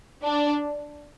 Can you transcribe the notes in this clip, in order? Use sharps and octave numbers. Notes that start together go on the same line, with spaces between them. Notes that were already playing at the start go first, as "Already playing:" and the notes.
D4